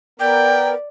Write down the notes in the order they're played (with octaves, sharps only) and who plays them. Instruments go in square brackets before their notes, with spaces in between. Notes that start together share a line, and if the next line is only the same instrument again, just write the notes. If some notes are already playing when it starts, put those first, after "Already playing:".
[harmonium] B3 A#4 [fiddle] D5 [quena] G5